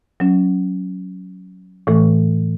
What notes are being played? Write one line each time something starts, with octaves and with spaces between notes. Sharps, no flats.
F#3 C#4
A2 E3 A3